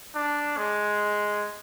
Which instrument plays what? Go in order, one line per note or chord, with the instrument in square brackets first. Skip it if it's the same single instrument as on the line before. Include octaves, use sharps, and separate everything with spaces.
[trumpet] D4
G#3